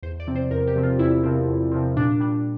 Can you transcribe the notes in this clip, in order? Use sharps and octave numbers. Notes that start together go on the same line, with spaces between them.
E2 C5
D5
C3 F3 C4
C5
E2 A#4
G4
C3 F3 C4
F4
E2 E4
C3 F3 C4
E2
C3 F3 C4
A#2 D4
G3 D4